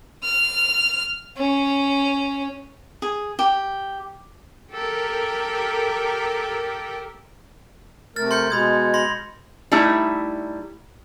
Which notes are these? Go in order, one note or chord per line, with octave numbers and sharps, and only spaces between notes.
F6
C#4
G#4
G4
G4 A4 A#4
C3 A3 A#4 F6 A6
C6 G6 C#7
B2 G#3 B5 D#6 G#6
B5 C6 A#6
G3 A3 D#4 E4